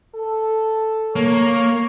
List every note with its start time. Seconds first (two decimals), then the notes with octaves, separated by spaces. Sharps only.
0.15 A4
1.16 A#3 C#5